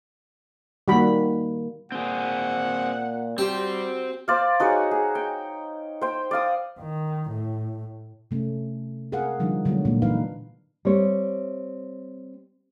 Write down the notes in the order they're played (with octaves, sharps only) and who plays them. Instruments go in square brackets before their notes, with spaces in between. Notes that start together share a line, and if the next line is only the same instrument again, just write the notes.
[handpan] D#3 A#3 [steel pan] G3 F#4 B5
[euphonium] A#2 [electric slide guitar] C4 G#4 [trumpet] F#5
[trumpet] G3 [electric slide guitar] C4 C5 [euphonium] F#4 [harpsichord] G4
[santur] C5 D5 F5
D#4 F#4 G#4 C#5
G#4
G5
C5 G5
D5 F5 D#6
[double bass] D#3
A2
[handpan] C3 A3 C#4
C4 G#4 A#4 F5 F#5
D3 F3 G3 D4 D#4
D3 F#3 G#3 B3 F#4
A#2 A#3
E3 D4 D#4 B4 F5
[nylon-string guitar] G3 C4 C#5